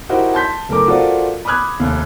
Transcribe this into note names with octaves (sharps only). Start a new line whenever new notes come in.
D#4 E4 F#4 G4 A#4 C5
A5 C6 G6 B6
F#1 A3 A#4 D6
F4 F#4 A4 A#4 C5 D5
B5 D6 D#6 F6 F#6 G#6
F1 D#2